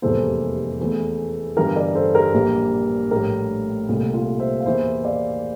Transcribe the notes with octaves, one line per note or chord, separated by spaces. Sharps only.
F1 E2 E3 G3 A#3 A4 C5
E2 E3 A3
G1 G2 E3 G4 A#4
A#4 D5
A4 C5
G4 A#4
A#1 A#2 G3 A#3
A#1 A2 G3 G4 A#4
C2 A#2 A3
F4
C5 E5
F5
E2 E3 A#3 C5 E5
D5 F5